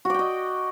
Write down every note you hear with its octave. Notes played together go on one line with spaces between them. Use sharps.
F#4 D5 D#5 G5